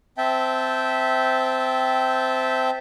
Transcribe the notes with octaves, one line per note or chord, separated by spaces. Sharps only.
C4 E5 G5 A5